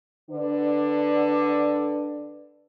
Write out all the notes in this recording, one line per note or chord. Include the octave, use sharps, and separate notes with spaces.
D3 D4 B4 D5